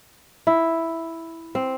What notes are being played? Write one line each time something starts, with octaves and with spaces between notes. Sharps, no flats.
E4
C4